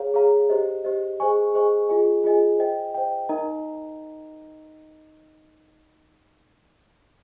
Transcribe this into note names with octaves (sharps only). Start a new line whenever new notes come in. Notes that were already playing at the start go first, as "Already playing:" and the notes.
Already playing: G#4 C#5 F5 A#5
G#4 C#5 F5 A#5
G4 C5 D#5
G4 C5 D#5
G#4 C5 D#5 G#5 C#6
G#4 C5 D#5 G#5 C#6
F4 G#4 D#5 G#5
F4 G#4 D#5 G#5
C5 D#5 G5
C5 D#5 G5
D#4 A#4 D#5 A#5